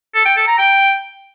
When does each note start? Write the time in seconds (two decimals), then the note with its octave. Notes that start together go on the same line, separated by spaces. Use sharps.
0.15 A4
0.25 G5
0.36 A4
0.47 A#5
0.58 G5